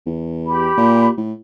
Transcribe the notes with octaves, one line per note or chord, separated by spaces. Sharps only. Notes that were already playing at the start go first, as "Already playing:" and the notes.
E2
G4 B5
A#2
A2